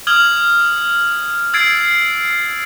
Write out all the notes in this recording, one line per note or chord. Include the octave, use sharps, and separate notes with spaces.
D#6 F6 G#6 F#7
E6 G#6 A6 C7 D7